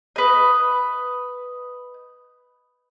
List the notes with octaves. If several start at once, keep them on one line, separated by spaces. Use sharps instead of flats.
B4 D#5